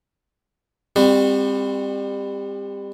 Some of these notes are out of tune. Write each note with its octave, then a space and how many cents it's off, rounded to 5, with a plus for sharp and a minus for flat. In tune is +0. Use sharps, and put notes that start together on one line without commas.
G3 +30 C4 +0 F#4 -10